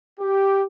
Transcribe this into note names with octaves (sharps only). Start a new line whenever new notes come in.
G4